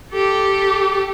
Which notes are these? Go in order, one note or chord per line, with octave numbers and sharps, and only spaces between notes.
G4 A4